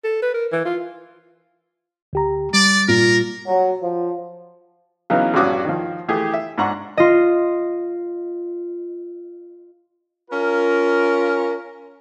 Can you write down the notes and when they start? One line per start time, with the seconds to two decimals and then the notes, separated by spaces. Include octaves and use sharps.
0.04 A4
0.22 B4
0.34 A#4
0.52 E3
0.65 F4
2.13 D2 G4 A#5
2.54 G3 D5
2.88 A#2 A#4
3.46 F#3
3.83 F3
5.10 C#3 E3 F#3 B3 D#4
5.34 A#1 G2 C#4 F#4 D6 D#6
5.65 D#3 F3
6.08 E3 A3 G4 G#4
6.34 E5
6.58 G#2 D4 F#5 A#5 C#6
6.97 F4 D#5
10.31 C#4 F4 A#4